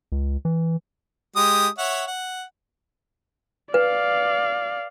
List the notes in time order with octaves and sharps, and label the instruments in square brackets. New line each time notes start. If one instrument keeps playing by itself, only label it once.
[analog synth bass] C#2
E3
[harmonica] G#3 G4 D#6
C#5 E5 F#5
F#5
[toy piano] B4 [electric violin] D5 F5